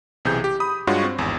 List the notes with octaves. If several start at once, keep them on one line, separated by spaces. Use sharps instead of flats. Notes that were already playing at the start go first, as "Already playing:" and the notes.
B1 C3 E3 G#4 G6
G4
B5 D#6
G2 G#3 F4 F#4 C#5 C#6
C4
G#1 E2